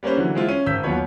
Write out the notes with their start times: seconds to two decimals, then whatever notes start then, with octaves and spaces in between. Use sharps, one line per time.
0.03 G3 A#3 C#4 B4 C5
0.17 D3 E3 F#3
0.35 G#3 C4 E4 F4
0.48 C#4 D#7
0.66 G#1 E6 G6 B6
0.83 D#2 F#3 B3 F4 C#5 B5